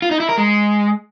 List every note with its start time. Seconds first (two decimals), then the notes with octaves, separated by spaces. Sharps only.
0.02 F4
0.11 D#4
0.20 E4
0.29 A#4
0.38 G#3